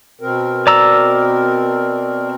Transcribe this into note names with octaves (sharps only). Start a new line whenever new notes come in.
B2 C4 A#4
D5 A#5 E6